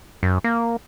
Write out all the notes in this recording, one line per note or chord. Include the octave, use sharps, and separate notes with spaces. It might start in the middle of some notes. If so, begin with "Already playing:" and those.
F#2
A#3